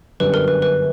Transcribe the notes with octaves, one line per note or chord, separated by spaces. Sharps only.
G1 F#2 D3 G3 B4
A#4
B4
B4